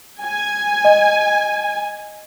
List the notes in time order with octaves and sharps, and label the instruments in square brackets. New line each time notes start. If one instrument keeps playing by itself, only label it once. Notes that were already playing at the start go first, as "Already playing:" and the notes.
[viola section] G#5
[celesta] D#5